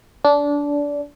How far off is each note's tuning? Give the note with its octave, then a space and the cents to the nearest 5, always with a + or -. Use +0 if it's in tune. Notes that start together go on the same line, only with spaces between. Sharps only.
D4 -20